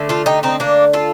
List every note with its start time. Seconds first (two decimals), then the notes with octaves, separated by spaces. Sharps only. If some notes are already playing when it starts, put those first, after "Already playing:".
Already playing: D3 A3
0.09 F4 A4
0.26 D#4 G4
0.43 C4 D#4
0.60 A#3 D4
0.93 F4 A4